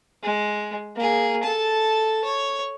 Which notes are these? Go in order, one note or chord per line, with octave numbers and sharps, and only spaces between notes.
G#3
A#3 G#4
A4 A5
C#5